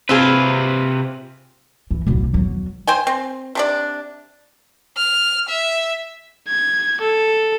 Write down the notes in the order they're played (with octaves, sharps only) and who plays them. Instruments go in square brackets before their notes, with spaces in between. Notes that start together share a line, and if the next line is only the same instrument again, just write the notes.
[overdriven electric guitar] C3 B4 [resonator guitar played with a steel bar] C4 F4 G#4
[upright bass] E3
D1 B1
E2 F#3
[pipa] C5 G5 G#5
C4
C3 D4 D5
[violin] F6
E5
[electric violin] G#6
A4